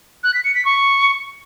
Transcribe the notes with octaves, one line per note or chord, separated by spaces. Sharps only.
F#6
B6
C#7
B6
C#6